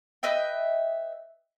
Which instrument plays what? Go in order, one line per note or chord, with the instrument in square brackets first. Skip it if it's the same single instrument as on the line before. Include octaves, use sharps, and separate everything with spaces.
[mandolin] B4 D#5 E5 G5